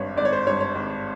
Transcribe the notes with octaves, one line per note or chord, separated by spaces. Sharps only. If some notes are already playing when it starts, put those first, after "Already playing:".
Already playing: G#1 G2 C#5
G#1 D5
C#5
C5
G2 C#5
C#5
G#1